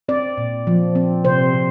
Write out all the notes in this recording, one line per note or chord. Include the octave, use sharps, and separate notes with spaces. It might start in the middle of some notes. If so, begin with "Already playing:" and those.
C4 D5
A#2
F3
C4
C3 C5
C3